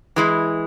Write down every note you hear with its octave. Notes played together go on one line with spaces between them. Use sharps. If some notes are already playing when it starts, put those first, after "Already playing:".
E3 G#3 E4